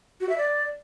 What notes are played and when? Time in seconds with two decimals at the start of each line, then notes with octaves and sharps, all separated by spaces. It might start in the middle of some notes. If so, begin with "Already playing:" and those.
0.21 F#4
0.29 E5
0.38 D5